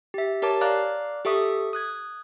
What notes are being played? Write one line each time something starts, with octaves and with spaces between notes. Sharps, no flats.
G4 E5
G4 A#4 C#5 A5 D6
D5 F5 A#5 D6 F#6
G4 A4 E5 C#6 D#6
D#6 F#6 G#6